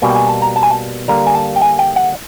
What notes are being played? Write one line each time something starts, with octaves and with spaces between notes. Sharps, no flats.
B2 G3 A#3 G#5
G5
G#5
A5
A#5
A5
G#5
A5
D3 G3 A#3 A#5
G#5
A5
G5
G#5
G5
F#5